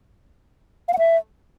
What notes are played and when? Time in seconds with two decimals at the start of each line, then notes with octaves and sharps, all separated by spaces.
0.88 F5
0.94 F#5
0.99 E5